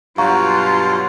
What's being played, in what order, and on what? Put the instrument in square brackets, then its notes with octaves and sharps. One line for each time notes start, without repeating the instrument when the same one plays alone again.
[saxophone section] G2 B2 F#3 [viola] F4 [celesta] F5 A#5 C#6